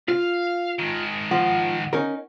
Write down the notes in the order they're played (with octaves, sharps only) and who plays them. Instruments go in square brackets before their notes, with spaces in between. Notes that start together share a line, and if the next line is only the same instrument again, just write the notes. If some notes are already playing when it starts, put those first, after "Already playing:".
[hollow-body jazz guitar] F4 [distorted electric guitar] F5
[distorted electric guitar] G#2 D#3
[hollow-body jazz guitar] F3 [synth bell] F#5
[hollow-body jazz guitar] C#4 D#4 A#4